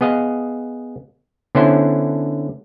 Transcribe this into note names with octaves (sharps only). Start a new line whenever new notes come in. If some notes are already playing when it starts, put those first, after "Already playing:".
B3 G#4 D#5 F5
D3 B3 C#4 D4 E4 C5